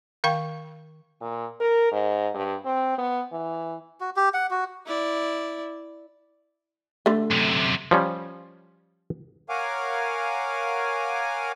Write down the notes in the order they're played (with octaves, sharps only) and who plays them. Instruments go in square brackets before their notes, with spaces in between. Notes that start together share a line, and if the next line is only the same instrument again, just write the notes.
[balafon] D#3 F5 G5 C#6
[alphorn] A#2
A#4
G#2
G2
C4
B3
E3
[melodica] F#4
G4
F#5
F#4
[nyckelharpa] E4 D5
[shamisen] D3 A3
[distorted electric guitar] F#2 C3
[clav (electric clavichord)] F3 G3 C#4
[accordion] A#4 C#5 F5 F#5 G#5 D6